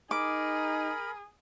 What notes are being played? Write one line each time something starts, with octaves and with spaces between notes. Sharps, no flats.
D#4 G#4 A#4 B5 D6